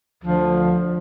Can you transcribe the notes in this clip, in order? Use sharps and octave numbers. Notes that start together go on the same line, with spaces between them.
D2 D3 F3